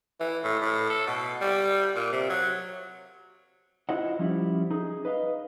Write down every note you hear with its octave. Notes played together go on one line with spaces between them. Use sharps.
E3
A2
A2
A4
B2
G3
A#2
C3
F#3
E4 F4 C5 D#5 E5 F#5
F3 G3 C#4 E4 F4
D#4 G#4
B4 D#5 F5